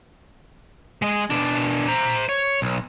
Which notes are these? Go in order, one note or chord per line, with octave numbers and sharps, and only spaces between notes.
G#3 D#5
B2 D4
C5 A#5
C#5
B1